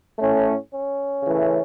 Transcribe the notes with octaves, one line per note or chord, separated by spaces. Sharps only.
A2 A3 C#4
C#4
C#3 E3 A3